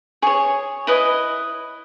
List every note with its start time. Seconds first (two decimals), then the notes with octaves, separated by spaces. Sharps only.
0.22 G#4 C#5 C#6
0.87 E4 B4 D#5